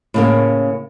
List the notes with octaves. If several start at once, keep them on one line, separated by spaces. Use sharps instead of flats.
A2 C#3 A#3